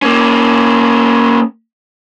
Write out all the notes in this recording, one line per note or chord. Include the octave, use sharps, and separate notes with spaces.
A#3 C#4